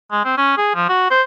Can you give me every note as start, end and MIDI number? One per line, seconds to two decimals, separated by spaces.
0.12 0.23 56
0.25 0.37 60
0.38 0.55 61
0.58 0.72 68
0.75 0.86 53
0.89 1.09 66
1.11 1.22 72